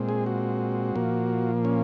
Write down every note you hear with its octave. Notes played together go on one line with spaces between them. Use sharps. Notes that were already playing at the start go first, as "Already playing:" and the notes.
Already playing: A#2 G#3 C4
G#4
F#4
A#2 F3 A#3
C#4